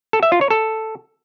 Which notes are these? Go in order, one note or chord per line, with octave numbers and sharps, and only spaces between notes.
A4
E5
F4
C#5
A4